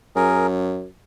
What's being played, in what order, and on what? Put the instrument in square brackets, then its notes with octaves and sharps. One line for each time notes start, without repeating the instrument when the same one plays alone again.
[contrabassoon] F#2 [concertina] G#4 A#4